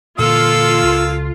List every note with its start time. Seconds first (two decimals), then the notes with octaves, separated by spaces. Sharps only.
0.19 A#2 D3 E3 A#3 F4 A4 F5 E6
0.83 C#2